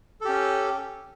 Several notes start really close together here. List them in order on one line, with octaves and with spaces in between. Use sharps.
A4 G4 C#4